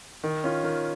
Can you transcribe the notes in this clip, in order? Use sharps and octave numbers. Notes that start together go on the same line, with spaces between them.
D#3
C#4 F4
D#3